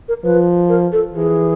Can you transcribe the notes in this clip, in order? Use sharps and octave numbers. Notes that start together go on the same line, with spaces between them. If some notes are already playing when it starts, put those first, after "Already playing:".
A#4
F3 B4
A#4
A4
E3 G#4